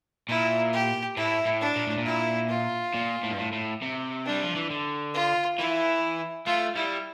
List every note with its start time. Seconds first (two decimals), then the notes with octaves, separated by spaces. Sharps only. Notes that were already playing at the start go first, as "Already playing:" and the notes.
0.29 A#2 E4
0.73 G4
1.17 A2 E4
1.46 A2
1.61 D4
1.76 A#2
1.87 A2
1.98 A#2
2.06 E4
2.49 F4
2.94 A#2
3.24 A2
3.30 G2
3.39 A2
3.53 A2
3.82 C3
4.26 G3 D4
4.43 F3
4.56 E3
4.70 D3
5.14 F4
5.58 E3 E4
6.46 A3 F4
6.76 G3 E4